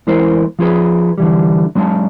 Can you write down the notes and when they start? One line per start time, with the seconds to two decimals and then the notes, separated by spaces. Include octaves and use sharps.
0.07 E2 G#3 E4 A#4 C5
0.59 F3 F4 G#4 B4
1.18 D3 E3 G3
1.75 F#3 G#3 D4 G#5 A5